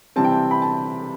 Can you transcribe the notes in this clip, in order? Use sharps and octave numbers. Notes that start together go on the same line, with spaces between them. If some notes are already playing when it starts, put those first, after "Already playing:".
C3 E3 G3 C4 A5
G5
A5
B5
A5